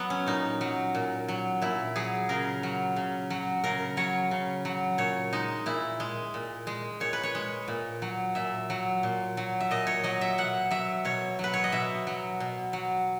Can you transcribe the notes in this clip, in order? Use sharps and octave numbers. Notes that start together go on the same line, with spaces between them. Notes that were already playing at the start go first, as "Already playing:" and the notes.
Already playing: F#3 B3
C#4
A#2 D#4
F#3
A#2
F#3
A#2 E4
F#3 G#4
C#3 A#4
F#3
C#3
F#3
C#3 A#4
F#3 C#5
C#3
F#3
A#2 C#5
G#3 D#4
A#2 E4
G#3
A#2
G#3
A#2 C#5
B4
C#5
G#3
A#2
F#3
A#2 E5
F#3
A#2
F#3
E5
A#2 D#5
C#5
F#3 D#5
E5
B2 F#5
F#3 E5
B2 C#5
F#3 B4
C#5
D#5
B2 E5
F#3
B2
F#3